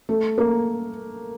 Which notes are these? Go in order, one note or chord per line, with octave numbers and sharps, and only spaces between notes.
A3
A#3